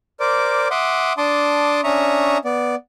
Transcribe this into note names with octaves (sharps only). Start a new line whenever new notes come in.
A#4 C5 D5 D6
E5 F#5 C6 D6 D#6
D4 A5 C6 D6 D#6
C#4 D4 E5 A#5 C#6 D#6
B3 D5